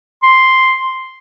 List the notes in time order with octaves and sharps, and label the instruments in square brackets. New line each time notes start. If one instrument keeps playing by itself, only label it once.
[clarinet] C6